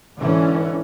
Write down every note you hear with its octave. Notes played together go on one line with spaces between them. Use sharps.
G#2 D3 E3 C#4